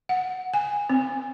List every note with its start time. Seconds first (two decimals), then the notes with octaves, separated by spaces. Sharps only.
0.09 F#5
0.54 G#5
0.90 C4